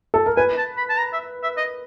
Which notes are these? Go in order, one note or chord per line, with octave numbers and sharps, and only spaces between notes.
A4
A#4
B4 G#5
A5
B5
A5
A#5
E5
E5
D#5